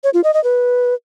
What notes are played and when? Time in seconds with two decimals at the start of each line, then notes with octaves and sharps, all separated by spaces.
0.04 C#5
0.14 F4
0.24 D#5
0.34 D#5
0.44 B4